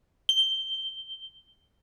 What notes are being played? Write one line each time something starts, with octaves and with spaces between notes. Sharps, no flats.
G7